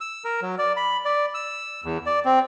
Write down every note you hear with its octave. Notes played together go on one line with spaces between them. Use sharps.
E6
A#4
F#3
D5
B5
D5
E6
E2
D5
C4